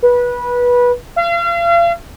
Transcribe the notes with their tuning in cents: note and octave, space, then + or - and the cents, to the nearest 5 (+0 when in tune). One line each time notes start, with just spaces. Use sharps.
B4 -20
F5 -40